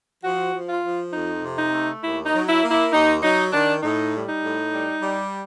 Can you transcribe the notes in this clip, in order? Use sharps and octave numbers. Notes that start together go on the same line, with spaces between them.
F3 F#4
F3
F4
F3
F2 D#4
C3
D#4
A3
D#2 E4
D#4
F#3
E4
A#3
E4
D#2 D#4
F#3 D#4
D#3 D4
A2 D#4
G3
D#4
A2
G3
G3